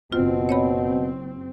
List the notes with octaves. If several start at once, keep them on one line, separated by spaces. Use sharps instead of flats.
F#1 B2 C4 F4
C#5 D#5 B5